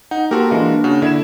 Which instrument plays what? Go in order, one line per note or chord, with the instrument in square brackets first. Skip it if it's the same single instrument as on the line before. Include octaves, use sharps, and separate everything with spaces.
[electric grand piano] D#4 [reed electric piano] F#5
[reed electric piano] A#3 [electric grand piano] F#4 A#4 [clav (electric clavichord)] G4 A4 C5
[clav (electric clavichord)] E3 G#3 F4 [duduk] D4
[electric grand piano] C#3 [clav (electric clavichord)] F#4
[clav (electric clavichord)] D3 [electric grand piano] E4 G#6 E7